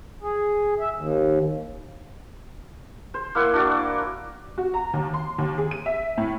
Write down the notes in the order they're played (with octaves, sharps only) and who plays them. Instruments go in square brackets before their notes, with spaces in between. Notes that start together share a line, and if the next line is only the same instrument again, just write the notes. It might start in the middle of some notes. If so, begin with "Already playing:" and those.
[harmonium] G#4
E5
D#2
[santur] C5
A#3 E4 F#5 C6
D4 F#4 D5
[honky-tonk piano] F#4
A#5
D#2
C6
D#2
G#4
D#7
E5
A2